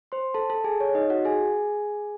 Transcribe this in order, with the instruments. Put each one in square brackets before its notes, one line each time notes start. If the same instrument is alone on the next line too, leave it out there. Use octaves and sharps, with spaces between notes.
[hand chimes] C5 C6
A4 A5
A4 A5
G#4 G#5
C#5
D#4 D#5
F#4 F#5
G#4 G#5